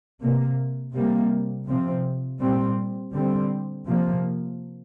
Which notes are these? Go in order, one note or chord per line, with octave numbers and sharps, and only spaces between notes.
C3 A#3
C3 G3 A#3
C3 F3 C4
A#2 G3 C4
D3 G3 C4
C3 F3 A#3